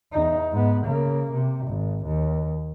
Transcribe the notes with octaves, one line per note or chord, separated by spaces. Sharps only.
E2 D#4
G#2 B3
C#3 A#3
C3
G#1
D#2